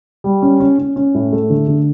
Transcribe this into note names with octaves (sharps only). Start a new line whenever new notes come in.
G3
C#4
C#4
C#4
C#4
A2
A3
D3
D3